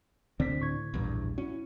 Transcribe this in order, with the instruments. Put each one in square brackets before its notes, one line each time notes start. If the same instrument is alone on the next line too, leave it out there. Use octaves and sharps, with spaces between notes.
[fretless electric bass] D2 D3 C4 [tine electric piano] D5 B6
[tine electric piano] A2 C#6 G#6
[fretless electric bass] A#1 E2 G2
[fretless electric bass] C#4 [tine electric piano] E4 F#4